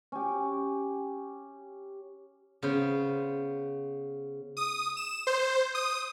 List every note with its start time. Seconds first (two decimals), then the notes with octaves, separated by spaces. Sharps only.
0.12 C#4 G4
2.62 C#3 B3 C5
4.57 D#6
4.97 E7
5.27 C5
5.75 D#6